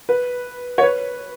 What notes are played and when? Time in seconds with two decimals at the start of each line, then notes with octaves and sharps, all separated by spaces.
0.09 B4
0.78 C#5
0.83 B4